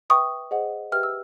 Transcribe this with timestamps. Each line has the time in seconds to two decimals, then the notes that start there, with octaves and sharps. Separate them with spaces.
0.10 B4 E5 G5 C#6 D#6
0.51 G#4 C5 D#5 F#5
0.92 G4 B4 E5 G5 F6
1.03 E6